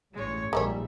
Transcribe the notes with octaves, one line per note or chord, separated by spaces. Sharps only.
A1 G2 G#3 C#5
A#1 G3 G#3 A#3 D#4 A4 C#5 E5